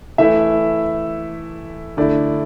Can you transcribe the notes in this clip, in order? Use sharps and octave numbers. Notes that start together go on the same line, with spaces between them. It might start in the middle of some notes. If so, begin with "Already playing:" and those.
E3 A3 E4 E5
D3 A3 E4 D5